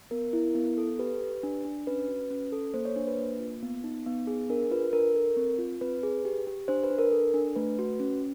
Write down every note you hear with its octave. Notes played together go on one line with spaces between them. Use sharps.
B3 A#4
E4
B3
A4
G4 B4
G4
D4
D4
C#4 B4
F#4
C#4
A4
A#3 C5
C#5
D4 C5
B4
A#3
F4
B3
D#4
B3
G#4
D4 A#4
F4 B4
D4 A#4
A4
C4
F4
C4 B4
G#4
G4
G4
D4 C5
B4
D4
A#4
A4
D4
A3 B4
F#4
C#4